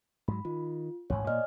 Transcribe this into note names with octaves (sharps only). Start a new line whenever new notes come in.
G#2 F#3 B5
D#3 F4
A1 D2 G#2 C#5 G#5
A#2 A#3 D5 D#5 F6